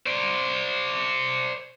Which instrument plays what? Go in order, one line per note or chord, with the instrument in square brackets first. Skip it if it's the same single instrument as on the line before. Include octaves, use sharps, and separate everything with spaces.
[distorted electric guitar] C5 D5